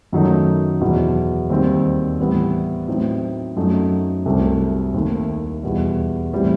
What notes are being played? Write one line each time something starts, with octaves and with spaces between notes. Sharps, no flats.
F#2 D#3 F#3 A3 D#4
E2 B2 F#3
D#2 D#3 G3 C4
A2 E3 G3 B3
A2 F#3 C4 D#4
F#2 F#3 A3 D#4
C2 C3 F#3 A3
D#2 D#3 A3
E2 B2 G3
A2 E3 G3 C4